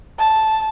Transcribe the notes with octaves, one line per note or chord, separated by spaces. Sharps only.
A5